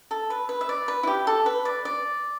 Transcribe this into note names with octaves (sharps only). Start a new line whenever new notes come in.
A4
B4
B4
E5
D5
B4
E4
G4
A4
B4
D5
D5